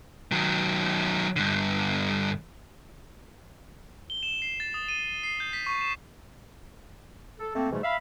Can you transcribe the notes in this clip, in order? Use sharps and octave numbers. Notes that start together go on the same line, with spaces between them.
D#3 F#3
G2 D3
G7
E7
C7
A6
D#6
D#7
C7
G6
B6
C#6
E7
A4
A3 A#3 C4
G#2 B2 E3 G3 A3
E5 F5 B5